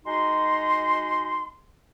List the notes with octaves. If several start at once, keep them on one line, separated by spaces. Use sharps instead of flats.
G#3 D#4 F#4 C6